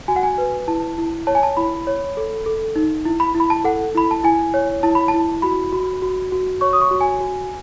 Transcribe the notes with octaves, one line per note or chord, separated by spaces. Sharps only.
F#4 G#5
F#5
G#5
B4
E4 A5
E4
C#5 A5
G#5
A5
E4 B5
C#5
A4
A4
D#4
E4
B5
E4
B5
A5
A4 F#5
E4 B5
A5
E4 G#5
C#5
E4 A5
B5
A5
E4
F#4 B5
F#4
F#4
F#4
C#5 C#6
D#6
C#6
F#4
G#5
F#4